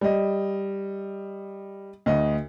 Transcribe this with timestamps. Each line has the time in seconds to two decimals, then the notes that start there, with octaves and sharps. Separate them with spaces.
0.01 G3 D#5
2.06 D2 D#5